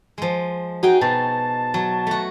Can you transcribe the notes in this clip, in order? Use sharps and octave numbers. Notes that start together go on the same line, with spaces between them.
F3 G#3
D#4 F#4 G#4 G5
B2 A5
F#3
A3 F#4